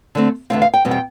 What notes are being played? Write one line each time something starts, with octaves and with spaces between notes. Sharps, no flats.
D3 A3 C4
E2 D3 A3 C4 F5
F5
G5
E2 B2 G3 C4
G5